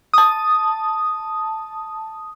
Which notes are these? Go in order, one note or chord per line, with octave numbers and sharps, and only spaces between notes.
A5 D#6